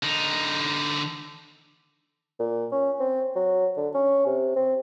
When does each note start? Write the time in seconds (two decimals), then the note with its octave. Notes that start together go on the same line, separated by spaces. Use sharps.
0.03 D3 D#4
2.40 A#2
2.72 C#4
3.00 C4
3.36 F#3
3.77 D3
3.94 C#4
4.26 C3
4.56 C4